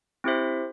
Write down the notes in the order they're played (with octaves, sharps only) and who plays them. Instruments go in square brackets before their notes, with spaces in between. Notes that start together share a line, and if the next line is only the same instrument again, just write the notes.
[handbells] C4 E4 G4 C5 E5